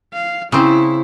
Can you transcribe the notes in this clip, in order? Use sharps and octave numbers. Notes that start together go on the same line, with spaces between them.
F5
C#3 C4 E4